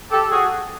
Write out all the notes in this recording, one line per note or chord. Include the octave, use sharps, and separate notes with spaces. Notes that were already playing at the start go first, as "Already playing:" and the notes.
G4 A4
F#4 G#4